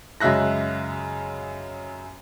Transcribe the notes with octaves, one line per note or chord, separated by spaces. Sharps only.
F#2 C#3 G#3 E5 F#6 A#6